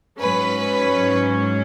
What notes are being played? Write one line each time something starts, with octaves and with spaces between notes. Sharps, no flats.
G#2 F#3 C#4 B4